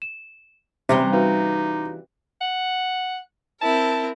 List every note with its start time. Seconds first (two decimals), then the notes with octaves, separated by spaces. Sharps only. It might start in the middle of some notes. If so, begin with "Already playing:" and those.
0.02 E7
0.89 C3 E3 G3 C#4 C5 A#5 G7
1.13 D#4 F#4 B4 F5
2.41 F#5
3.61 C4 E4 A#4 A5